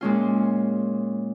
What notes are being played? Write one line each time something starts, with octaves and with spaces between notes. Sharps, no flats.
A#2 G#3 C#4 F4